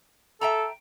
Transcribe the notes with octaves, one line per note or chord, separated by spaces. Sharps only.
A4 E5 G5 A#5